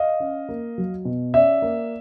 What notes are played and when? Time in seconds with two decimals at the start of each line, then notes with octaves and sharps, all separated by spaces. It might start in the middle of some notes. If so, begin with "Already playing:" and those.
Already playing: D#5 F5
0.20 C#4
0.49 A#3
0.78 F#3
1.05 B2
1.34 C#4 D5 E5
1.62 A#3